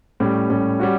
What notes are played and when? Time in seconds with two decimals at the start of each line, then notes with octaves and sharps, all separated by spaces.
0.20 A2 G3 C#4
0.50 A2 G3 C#4
0.80 G3 C#4 F#4